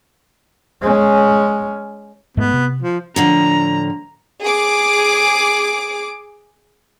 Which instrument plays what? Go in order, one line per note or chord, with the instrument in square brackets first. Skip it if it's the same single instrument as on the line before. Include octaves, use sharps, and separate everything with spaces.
[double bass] G#3 C#4
[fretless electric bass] G#2 G#3 A3 [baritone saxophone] B3
[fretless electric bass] C3
[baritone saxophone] F3
[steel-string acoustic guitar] A2 D3 F3 [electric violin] A#5
[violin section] G#4 D6